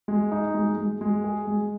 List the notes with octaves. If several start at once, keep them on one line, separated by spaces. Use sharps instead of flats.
G#3
D#4
G#3
G#3
G#3
G#4
G#3